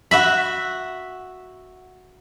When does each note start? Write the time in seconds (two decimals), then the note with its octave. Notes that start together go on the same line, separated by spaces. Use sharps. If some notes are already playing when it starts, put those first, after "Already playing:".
0.11 F#4 E5 B5